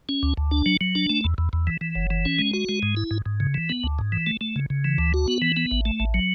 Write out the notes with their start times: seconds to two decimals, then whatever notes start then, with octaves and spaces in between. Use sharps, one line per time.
0.09 C#4
0.23 D2
0.37 D2
0.51 D4
0.66 F#3
0.81 F#3
0.95 D4
1.10 A3
1.24 E2
1.38 E2
1.53 E2
1.67 E3
1.81 E3
1.95 F#1
2.10 E3
2.25 C#4
2.39 G#3
2.53 F#4
2.69 G#3
2.83 G#2
2.97 E4
3.11 G#2
3.26 G#2
3.40 C#3
3.54 E3
3.69 B3
3.84 D2
3.99 G#2
4.12 E3
4.27 A3
4.41 A3
4.56 C#3
4.70 C#3
4.85 E3
4.98 D2
5.14 F#4
5.28 B3
5.42 E3
5.57 B3
5.71 A1
5.85 A3
6.00 A1
6.14 F#3